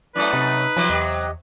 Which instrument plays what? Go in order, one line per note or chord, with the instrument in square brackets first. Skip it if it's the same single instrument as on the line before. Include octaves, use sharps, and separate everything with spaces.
[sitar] F#2 A3 [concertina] E4 D5 [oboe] B4
[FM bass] C3 [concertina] D#4 D#6
[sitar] C3 F#3 [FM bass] F3
[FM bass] E2 [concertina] G4 D#5